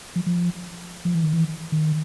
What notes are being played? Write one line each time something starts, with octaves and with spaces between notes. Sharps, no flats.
F3
F3
F3
E3
D#3
E3
D#3